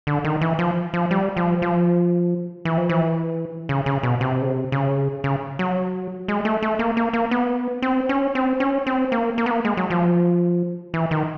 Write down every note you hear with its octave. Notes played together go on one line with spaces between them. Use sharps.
D3
D#3
E3
F3
F3
G3
F3
F3
E3
F3
E3
C#3
C#3
B2
C3
C#3
C3
C#3
C#3
F#3
G#3
A3
A3
A#3
A#3
A#3
B3
C4
C#4
C4
C#4
C4
A#3
A#3
B3
A#3
G#3
F#3
F3
E3
D#3